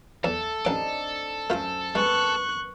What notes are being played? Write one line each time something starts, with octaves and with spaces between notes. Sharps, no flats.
E2 A3 A4
A1 C4 D4 D#4 D6
F#2 A3 F4 C5
G#3 A#3 B3 C#6 F#6